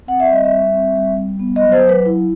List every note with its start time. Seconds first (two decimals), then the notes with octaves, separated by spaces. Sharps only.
0.07 C4 F#5
0.20 E5
0.30 G3 D#5
0.45 E5
0.52 G3
0.73 C4
0.96 G3
1.17 G3
1.39 B3
1.56 D#5
1.61 F#3
1.72 C5
1.83 F#3
1.89 B4
2.06 E4